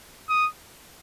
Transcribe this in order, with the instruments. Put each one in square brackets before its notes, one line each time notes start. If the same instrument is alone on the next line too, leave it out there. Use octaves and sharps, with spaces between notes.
[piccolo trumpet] D#6